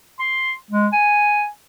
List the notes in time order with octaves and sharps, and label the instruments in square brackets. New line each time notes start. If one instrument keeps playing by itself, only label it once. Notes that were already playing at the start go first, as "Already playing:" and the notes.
[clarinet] C6
G#3
G#5